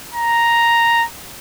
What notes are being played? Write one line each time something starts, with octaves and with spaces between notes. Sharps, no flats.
A#5